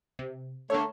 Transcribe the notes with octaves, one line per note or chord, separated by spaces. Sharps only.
C3
D3 A3 A#3 C#5